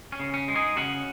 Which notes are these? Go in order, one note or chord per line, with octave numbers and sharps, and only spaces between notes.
C#4
C#3
C#4
G#3
D#4 G#4
C#3 C#4 F#4